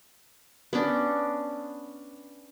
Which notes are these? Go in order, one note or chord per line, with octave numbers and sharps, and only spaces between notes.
B3 C#4 D4